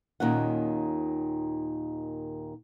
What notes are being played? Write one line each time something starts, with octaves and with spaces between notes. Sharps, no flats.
D#2 A#2 D#3 C#4 F#5